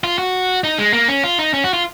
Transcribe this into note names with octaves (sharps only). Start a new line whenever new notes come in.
F4
F#4
D#4
G#3
A#3
C#4
F4
D#4
C#4
F#4
F4